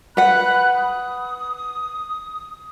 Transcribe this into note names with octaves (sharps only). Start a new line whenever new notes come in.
B4 F#5 B5 F#6
D#6